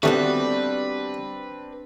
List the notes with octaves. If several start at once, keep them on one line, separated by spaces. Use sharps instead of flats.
D#2 G3 A3 B3 C4 D4 F#4 B4